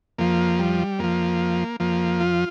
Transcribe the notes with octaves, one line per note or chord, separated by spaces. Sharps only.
F2 F3 A#3
G3
F2 F3 A#3
F2 F3 A#3
F4